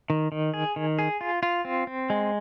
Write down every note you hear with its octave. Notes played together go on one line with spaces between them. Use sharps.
D#3
D#3
G#4
D#3
G#4
F4
F4
C4
C4
G#3